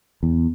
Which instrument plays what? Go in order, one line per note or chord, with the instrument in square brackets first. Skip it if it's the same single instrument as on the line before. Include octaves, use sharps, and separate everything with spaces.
[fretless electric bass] E2